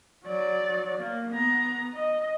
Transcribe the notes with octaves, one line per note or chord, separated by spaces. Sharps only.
F#3 D5
A#3
B3 A#5
D#5